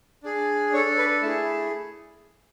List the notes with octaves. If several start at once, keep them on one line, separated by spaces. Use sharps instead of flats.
D4 G#4
D4 A4 C#5
B4
A3 E4 G#4 A5